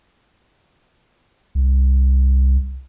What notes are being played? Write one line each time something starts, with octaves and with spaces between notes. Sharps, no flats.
C2